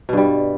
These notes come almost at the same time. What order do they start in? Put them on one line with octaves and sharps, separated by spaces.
B2 G2 G3